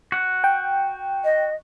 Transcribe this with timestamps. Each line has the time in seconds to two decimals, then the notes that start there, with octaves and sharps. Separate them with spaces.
0.12 F#4 F#5
0.44 G5
1.24 D#5